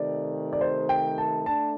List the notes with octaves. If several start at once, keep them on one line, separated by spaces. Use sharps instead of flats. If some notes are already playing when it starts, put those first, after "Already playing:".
Already playing: C3 D#3 A3 D5
D5
C5
G5
A5
A3 D4 A5